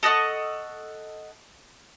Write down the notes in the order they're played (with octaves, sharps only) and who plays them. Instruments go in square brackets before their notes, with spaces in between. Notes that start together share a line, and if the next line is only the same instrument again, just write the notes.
[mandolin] A4 D#5 F#5 C#6